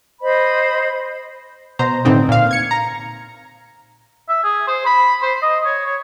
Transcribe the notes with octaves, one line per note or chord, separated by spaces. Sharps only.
C5 D#5 B5
B2 C5 A#5
A2 D3 E3 C4 D#4
A#2 F5
G#6 C#7
A#5
E5
G#4
C5
B5
C5
D#5
C#5
C#5